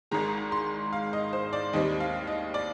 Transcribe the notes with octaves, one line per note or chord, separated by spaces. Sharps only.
G#1 G#2 D#3 G#3 A#5
C6
F5
D#5
C5
D5
D#2 D#3 G3 C4 D#5
F5
D#5
D5